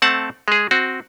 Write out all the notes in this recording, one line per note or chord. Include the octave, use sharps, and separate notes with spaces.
A3 C4 F#5 A5
G#3 G#4
C4 F#4